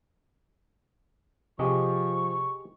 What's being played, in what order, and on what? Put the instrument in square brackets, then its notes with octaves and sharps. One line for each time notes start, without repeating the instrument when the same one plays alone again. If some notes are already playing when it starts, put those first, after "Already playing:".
[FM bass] C3 [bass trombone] F3 [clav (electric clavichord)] G4 G#4 D#5 [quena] C#6